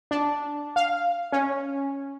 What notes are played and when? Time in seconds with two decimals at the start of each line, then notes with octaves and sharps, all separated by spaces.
0.11 D4
0.76 F5
1.32 C#4